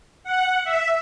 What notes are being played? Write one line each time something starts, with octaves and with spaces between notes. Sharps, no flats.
F#5
E5